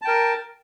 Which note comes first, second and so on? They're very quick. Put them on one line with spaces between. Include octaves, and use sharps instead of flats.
A5 G5 A#4